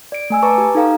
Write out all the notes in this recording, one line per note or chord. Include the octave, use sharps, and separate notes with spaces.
D5 D7
A3 G#5 E6
B4 A5 A#5 C#6 D6
G4
D#4 A4 F5 G5 A#5